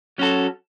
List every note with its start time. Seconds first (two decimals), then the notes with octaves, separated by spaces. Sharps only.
0.18 F#3 C#4 F#4 A4